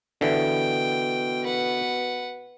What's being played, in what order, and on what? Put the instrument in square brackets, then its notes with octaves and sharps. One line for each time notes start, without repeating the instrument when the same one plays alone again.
[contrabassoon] B2 [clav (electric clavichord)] D3 E3 [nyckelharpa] G5
[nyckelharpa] B4 F#5